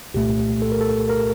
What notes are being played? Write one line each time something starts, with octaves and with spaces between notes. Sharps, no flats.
C2 A#2 A3 G4
A4
A#4
A4
A#4